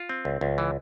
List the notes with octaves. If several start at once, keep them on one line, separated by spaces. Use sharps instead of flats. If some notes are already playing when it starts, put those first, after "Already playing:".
Already playing: F4
C4
C#2
C#2
E3